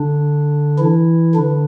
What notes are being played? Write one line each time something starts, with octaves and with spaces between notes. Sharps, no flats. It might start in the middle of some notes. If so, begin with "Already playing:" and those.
Already playing: D3 D4
E3 E4
D3 D4